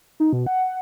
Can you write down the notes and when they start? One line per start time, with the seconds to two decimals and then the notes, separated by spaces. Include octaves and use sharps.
0.20 D#4
0.33 B2
0.47 F#5